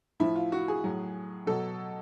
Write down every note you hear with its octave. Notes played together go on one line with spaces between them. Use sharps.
A2 F3 E4
F4
F#4
G#4
A2 F#3
B2 F#3 A4